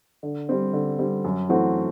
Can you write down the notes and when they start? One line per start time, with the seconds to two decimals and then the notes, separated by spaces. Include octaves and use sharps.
0.23 D3
0.49 G3 C4
0.73 D3
0.99 G3 C4
1.25 F#2
1.49 E3 A3 C4 F#4